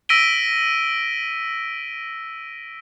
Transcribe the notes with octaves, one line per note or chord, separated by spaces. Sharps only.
E6 A#6 B6 D7 D#7 G7